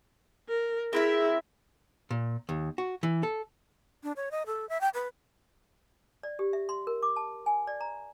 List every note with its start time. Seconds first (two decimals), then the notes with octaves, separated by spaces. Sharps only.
0.48 A#4
0.93 C4 E4 G#4 A#4 E5
2.11 A#2
2.49 D#2
2.78 F#4
3.03 E3
3.23 A4
4.03 D4
4.16 C#5
4.31 D#5
4.46 A4
4.69 E5
4.81 G5
4.94 B4
6.23 D5
6.39 G4
6.53 E5
6.69 C6
6.87 A#4
7.03 D6
7.16 A5
7.46 G#5
7.67 D5
7.81 A#5